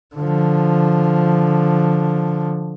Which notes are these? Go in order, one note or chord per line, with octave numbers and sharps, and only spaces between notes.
D3 F3